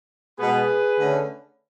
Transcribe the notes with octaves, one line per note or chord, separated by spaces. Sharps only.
B2 G#3 B3 G#4 B4
D3 A3 C#4